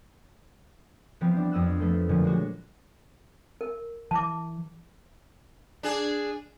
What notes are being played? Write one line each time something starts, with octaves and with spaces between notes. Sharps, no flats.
E3 F3 G3 B3 C4
D4
F2 D#6 E6 F#6
F3 A3 A4 B4
A#2 D3 F3 F#3
G#3 D4 F#4
A#4
E3 A5 D6
D4 G#4